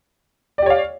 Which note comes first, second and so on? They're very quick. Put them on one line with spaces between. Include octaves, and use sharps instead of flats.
D5 G4 C#5 F5